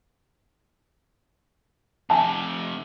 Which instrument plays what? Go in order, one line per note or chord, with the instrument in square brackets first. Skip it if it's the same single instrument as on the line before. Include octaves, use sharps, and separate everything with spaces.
[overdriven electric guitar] F2 C3 [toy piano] G#5 A5